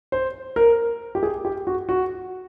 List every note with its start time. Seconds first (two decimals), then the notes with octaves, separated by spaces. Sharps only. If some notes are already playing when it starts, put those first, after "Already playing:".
0.12 C5
0.56 A#4
1.15 G4
1.23 G#4
1.45 G4
1.67 F#4
1.89 F#4